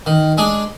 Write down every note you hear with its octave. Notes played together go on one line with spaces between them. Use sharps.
D#3
G#3 D4 G#4